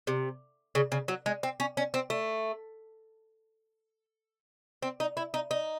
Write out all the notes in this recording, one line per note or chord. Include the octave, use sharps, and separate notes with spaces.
C3
C#3
C#3
F#3
G#3
C4
C#4
C#4
C4
A3
C4
D#4
E4
D#4
D#4